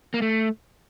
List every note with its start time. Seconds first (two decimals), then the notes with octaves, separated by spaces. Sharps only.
0.14 A#3
0.22 A3